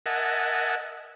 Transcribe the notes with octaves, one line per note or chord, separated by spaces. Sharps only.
A#4 D#5 E5 F#5 G#5 A5